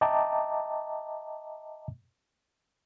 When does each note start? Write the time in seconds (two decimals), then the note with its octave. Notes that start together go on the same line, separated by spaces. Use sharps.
0.01 D#5 E5 G5 A5 A#5 D6